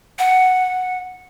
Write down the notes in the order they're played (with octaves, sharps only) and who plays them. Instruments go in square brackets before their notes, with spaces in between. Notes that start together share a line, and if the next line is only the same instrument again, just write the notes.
[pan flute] F#5